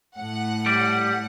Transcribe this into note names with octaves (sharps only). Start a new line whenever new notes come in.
A2 F#5
G3 D5